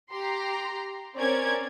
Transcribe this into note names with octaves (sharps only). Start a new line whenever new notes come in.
G4 A#5 C6
C4 C#4 A#4 C#5 D5 G#6